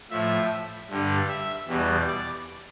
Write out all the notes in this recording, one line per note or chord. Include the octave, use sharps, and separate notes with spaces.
A2 F3 E5
G2 D3 G3
E5
E2 B2 G3
D5